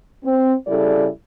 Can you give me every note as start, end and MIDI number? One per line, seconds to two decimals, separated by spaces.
0.25 0.53 60
0.67 1.07 49
0.67 1.07 55
0.67 1.07 64
0.67 1.07 69
0.67 1.07 74